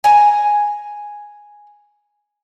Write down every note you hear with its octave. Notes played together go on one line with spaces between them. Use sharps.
G#5 A#5